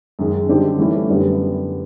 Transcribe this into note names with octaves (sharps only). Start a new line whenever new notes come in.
F#2 D#3 G#3
D3 G3 C4 D#4 G4
E3 A3 C#4 E4
F#2 D3 G3 B3